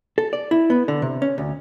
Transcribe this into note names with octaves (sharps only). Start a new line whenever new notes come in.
A4
D5
E4
B3
D3
C3
C#4
D2